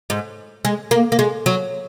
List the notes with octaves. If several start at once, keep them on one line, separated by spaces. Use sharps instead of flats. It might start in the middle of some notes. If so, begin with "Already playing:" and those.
G#2
G#3
A#3
A#3
G#3
F#3